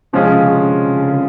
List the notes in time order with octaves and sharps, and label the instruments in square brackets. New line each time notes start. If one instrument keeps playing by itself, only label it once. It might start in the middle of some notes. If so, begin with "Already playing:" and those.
[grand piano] C3 [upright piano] F3 G#3 C#4 F4 G#4
[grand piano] C#3
D3
C#3
C#3
D3